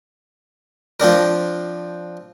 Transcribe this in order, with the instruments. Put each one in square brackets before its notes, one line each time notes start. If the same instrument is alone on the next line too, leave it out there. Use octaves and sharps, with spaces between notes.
[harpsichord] F3 C4 D4 A#4